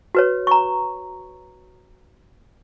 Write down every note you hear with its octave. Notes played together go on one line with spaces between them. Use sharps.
F#4 B4 C#5
A#5 C#6